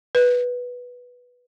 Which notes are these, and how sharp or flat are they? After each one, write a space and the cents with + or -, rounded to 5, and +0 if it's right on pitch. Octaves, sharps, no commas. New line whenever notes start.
B4 -5